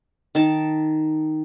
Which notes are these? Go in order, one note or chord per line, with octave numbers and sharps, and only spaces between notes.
D#3 A5